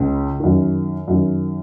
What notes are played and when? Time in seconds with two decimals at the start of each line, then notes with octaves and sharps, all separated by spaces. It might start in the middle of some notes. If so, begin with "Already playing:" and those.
Already playing: C#2 C#3
0.40 F#2 D#3
1.08 F#2 D#3